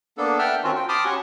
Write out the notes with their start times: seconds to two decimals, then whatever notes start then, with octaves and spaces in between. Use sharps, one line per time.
0.18 A#3 B3 D4 A4
0.39 E5 F#5 G5 A5 F6
0.64 D#3 C4 C#4 F4 F#4
0.76 G5
0.89 A5 B5 C6 D6 D#6 F6
1.05 C#4 F#4 G4 F#5 G#5 C#6